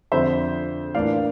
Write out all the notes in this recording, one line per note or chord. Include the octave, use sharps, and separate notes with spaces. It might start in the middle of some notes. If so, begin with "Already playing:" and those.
F2 D3 F3 C4 C5 E5
A2 E3 A#3 D4 D5 F5